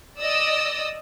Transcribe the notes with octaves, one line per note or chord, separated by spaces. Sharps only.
D5 D#5 D#6 E6